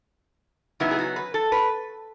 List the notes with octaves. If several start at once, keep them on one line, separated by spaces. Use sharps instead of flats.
C#3 F#3 B3 D#4 E4
G#4
F#4
B4
A4
B4